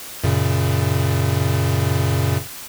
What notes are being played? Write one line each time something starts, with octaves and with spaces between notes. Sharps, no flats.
F#2 A#2 C#3